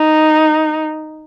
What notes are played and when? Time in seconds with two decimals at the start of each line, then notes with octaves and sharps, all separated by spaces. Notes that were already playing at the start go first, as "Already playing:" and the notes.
Already playing: D#4